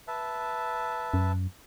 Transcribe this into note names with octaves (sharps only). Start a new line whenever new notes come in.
B4 E5 A5
F#2